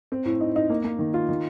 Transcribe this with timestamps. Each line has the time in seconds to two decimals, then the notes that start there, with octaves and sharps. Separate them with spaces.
0.12 C4
0.25 A2
0.41 D#4
0.56 D#4
0.70 A#3
0.84 A#3
0.99 D#3
1.14 F4
1.29 D#3